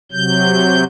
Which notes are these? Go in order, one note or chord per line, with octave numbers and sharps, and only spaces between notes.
C3 F#3 G6